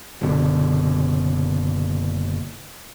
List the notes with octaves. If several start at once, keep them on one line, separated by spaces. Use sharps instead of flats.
F#1 B2 D3